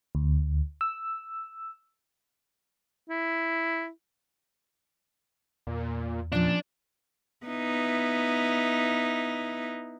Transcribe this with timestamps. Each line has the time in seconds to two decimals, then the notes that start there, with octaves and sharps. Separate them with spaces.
0.15 D2
0.81 E6
3.09 E4
5.67 E2 A#2
6.32 A#2 F3 C#4 D4
7.46 B3 D#4 E4